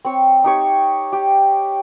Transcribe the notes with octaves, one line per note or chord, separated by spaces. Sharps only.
C4 C#5
D#4 G4 C#5
G4